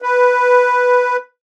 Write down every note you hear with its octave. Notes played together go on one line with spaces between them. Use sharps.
B4